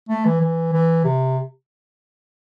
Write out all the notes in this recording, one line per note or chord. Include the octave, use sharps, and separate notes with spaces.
A3
E3
E3
E3
C3